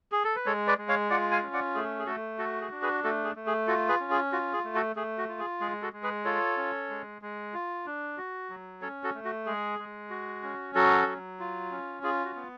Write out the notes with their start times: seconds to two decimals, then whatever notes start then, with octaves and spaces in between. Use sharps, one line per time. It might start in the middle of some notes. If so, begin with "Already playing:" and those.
0.12 G#4
0.24 A4
0.36 B4
0.46 G#3 A4 C#5
0.67 B4 D5
0.78 G#3
0.89 C#5 F5
1.10 F4 D5 F#5
1.31 F5 G#5
1.42 C#4
1.53 D5 F#5
1.75 A3 G#4
1.99 G#4
2.06 A3 F#4 A4
2.39 F#4 A4
2.61 G#4
2.71 D4
2.82 G#4 B4
3.04 A3 F#4 A4
3.24 G#4
3.36 A3
3.47 G#4
3.67 F4 F#4 A4
3.89 G#4 B4
4.00 C#4
4.11 G#4
4.32 F4 F#4
4.53 G#4
4.64 A3
4.75 F#4 A4
4.96 A3 G#4
5.18 F#4
5.28 F4
5.39 G#4
5.60 G#3 G#4
5.82 F#4 A4
5.93 G#3
6.03 G#4 B4
6.25 F4 A4 C#5
6.57 C#4
6.90 G#3
7.22 G#3
7.54 F4
7.86 D4
8.18 F#4
8.50 F#3
8.82 C#4 A4 C#5
9.04 F#4 A4
9.15 A3
9.25 F#4
9.46 G#3 G#4
9.79 G#3
10.10 F#4
10.43 C#4
10.75 F#3 F#4 A4
11.06 F#3
11.40 F4
11.71 C#4
12.03 F4 G#4
12.25 F#4
12.36 B3